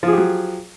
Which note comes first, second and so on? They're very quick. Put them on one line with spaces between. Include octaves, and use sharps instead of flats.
F3 G#4 G4 F#3